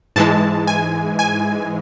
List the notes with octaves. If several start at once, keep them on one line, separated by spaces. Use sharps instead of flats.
G#2 E3 G#3 A5
G#5
G#5